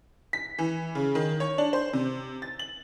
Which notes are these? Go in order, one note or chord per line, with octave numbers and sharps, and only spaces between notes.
B6
E3
C#3
D#3
C#5
D4
C5
C3
A6
F#7